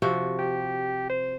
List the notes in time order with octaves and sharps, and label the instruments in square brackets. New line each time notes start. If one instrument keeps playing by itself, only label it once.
[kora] C3 F3 F#4
[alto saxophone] G4
C5